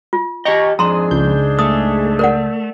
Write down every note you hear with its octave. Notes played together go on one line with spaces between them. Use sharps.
F4
G4 D#5 G5 A#5 C#6
F2 G#2 D4 G#4 A#5 C6 D#6
C#2 G6
A3 D#6
A#4 D5 F#5